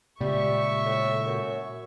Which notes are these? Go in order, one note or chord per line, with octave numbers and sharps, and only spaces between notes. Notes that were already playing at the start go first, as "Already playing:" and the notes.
A#2 C#3 G3 G#3 E5 C#6
A2
F#2